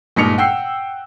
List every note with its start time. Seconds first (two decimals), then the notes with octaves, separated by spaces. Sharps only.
0.16 G1 A#2 G#3 D#4 C#7 F7
0.38 F#5 G5 E6 C7